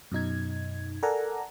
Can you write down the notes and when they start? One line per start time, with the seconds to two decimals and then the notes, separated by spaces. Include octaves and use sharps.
0.12 F#2 B2 D#4 G#6
1.03 A4 A#4 D5 F#5 G#5 A#5